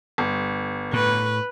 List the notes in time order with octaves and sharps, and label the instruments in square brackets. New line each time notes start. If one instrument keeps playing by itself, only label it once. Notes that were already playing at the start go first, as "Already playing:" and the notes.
[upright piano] G1
[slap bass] A2 [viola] B4